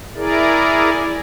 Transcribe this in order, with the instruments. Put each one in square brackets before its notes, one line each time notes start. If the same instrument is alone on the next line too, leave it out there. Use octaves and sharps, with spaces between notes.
[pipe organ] E4 G#4 A#4 D5